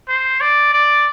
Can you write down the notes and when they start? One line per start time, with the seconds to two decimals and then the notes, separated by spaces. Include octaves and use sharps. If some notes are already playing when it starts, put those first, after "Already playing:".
0.09 C5
0.41 D5
0.73 D5